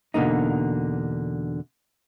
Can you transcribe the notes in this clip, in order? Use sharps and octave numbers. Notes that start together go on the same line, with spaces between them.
E2 B2 D3 A#3 D#4